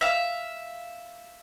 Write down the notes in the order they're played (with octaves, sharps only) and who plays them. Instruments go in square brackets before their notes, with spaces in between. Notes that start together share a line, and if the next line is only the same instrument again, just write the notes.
[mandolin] E5 F5